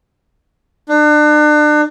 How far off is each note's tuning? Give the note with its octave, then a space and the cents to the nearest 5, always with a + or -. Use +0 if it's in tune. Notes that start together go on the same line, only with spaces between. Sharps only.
D4 +35